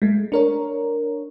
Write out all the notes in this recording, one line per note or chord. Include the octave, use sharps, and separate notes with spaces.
G#3 A3
D4 A#4 C#5